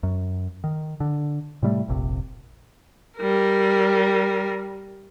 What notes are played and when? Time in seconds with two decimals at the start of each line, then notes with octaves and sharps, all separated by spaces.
0.03 F#2
0.64 D#3
1.00 D3
1.63 A2 C3 G3 A3
1.88 F1 A#1 C3
3.17 G3 A#4